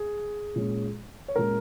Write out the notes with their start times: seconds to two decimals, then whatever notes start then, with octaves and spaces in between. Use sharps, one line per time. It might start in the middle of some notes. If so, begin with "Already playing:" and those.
Already playing: G#4
0.56 A#2 G#3 C#4
1.28 C#5
1.35 A#2 G#3 C#4 A#4